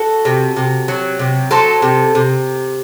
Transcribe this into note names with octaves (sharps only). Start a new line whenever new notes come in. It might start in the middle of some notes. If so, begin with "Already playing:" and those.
Already playing: F#4 A4
C3
C3
F#3
C3
F#3 A4 C5
C3
C3